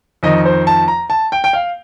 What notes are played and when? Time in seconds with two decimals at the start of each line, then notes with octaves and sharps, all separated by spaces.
0.23 F2 D#3 D#5
0.45 C5
0.67 A5
0.88 A#5
1.10 A5
1.32 G5
1.44 G5
1.53 F5